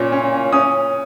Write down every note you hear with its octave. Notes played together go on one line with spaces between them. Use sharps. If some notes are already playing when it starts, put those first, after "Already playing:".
Already playing: A#2 C#4
C#4
C#4
C#4 D#6